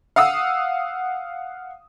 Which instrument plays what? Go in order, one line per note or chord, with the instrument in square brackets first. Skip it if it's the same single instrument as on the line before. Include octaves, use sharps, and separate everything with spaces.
[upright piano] F5 F#5 D#6 E6